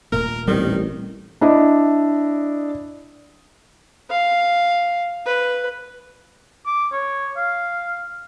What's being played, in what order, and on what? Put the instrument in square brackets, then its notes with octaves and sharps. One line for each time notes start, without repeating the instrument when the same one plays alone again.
[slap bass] D#1 A#2 A3 [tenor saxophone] A#4
[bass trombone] A1 [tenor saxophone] D#3 [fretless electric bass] G3 C4
[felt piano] D4 E4 D#5
[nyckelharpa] F5
B4
[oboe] D6
C#5
F5